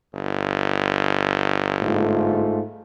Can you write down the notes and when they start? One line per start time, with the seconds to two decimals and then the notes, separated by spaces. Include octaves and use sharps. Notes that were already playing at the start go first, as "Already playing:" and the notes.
0.14 G1
1.82 G#2 A3 F4